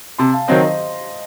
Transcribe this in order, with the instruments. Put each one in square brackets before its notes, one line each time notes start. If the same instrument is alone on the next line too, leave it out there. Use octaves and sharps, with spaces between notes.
[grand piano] C3 [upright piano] A5 C6
[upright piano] F5 A5
[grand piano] D#3 F#3 C4 [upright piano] C5 D#5
[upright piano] C5 D#5